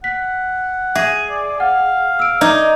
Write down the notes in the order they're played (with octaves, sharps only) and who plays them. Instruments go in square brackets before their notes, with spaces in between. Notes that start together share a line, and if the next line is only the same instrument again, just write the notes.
[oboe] F#5 [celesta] B6
[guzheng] G#4 [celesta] E5
[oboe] D5
[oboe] F5 [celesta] F#5
[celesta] E6 D7
[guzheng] D#4 [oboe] D5 [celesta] E5 G#6